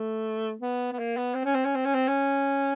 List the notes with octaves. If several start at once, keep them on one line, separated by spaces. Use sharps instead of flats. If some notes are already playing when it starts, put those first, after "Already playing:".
Already playing: A3
B3
B3
A#3
B3
C4
C#4
C4
C#4
C4
C#4
C4
C#4